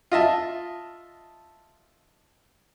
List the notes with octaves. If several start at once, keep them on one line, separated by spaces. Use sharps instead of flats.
F4 D#5 E5 A5